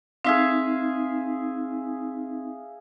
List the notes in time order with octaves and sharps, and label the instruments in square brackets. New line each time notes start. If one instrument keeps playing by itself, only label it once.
[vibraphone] C4 D#4 [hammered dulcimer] G#4 E5 F5